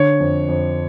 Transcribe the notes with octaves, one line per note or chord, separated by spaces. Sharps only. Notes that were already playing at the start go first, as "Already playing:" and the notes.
Already playing: D3 C#5
F2
F2